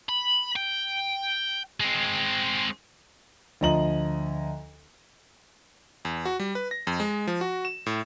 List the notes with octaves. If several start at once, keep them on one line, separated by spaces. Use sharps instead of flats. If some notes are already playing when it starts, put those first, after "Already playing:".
B5
G5
G#3 C4
D2 F3 D#5 A#5 F#7
E2
F#4
G3
B4
A#6
F2
G#3
F3
F#4
E7
A2